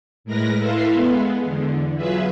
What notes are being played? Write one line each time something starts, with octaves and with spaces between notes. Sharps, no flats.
A2 G#3 A#4 B4 A#6
E4 A4 B4 E5 F5 C6
G#3 B3
E2 D3
F#3 F4 G#4 B4 E5